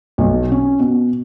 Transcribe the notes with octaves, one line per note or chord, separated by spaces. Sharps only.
B1
C#4
B2